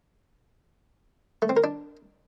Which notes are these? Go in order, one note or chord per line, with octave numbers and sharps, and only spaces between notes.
A3
C4
A#4
D4